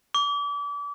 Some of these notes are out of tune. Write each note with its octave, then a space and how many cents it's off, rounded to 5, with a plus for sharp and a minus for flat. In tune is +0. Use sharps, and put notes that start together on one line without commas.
D6 -35